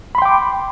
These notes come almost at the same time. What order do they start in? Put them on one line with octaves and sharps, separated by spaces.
B5 C6 G5 D6